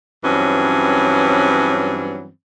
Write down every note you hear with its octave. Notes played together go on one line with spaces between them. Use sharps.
G2 E3 F#3 C4 C#4